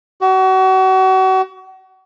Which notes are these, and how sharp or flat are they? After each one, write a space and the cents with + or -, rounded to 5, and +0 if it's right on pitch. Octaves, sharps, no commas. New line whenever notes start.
F#4 +35